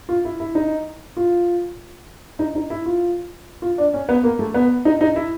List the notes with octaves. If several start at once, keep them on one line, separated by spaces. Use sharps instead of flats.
F4
E4
E4
D#4
F4
D#4
D#4
E4
F4
F4
D4
C#4
B3
A#3
A3
B3
D#4
D#4
E4